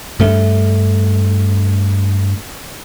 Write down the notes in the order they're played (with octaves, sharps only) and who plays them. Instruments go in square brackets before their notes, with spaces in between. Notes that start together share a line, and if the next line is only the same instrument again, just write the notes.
[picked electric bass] G2 A3